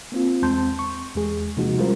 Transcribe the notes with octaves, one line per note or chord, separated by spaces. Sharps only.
A#3 C4 F4
E2 G#3 C4 A5 C6 G6
C#6
E2 G#3 G#4
C3 F3 G#3 A#3 D#4 F#4
G3 G#3 C#4 F4 A#4 C5